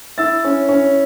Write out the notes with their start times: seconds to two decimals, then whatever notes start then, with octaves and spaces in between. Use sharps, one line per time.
0.18 E4 E6 A6
0.44 C#4
0.69 C#4